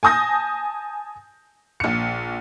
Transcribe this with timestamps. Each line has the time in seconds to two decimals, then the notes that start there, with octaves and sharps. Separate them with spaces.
0.03 G#5 A5 D#6 G6 A#6
1.80 A#1 C#7